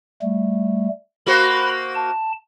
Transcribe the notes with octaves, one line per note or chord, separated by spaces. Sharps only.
G3 A3
A#3 F#4 C5 B5
A5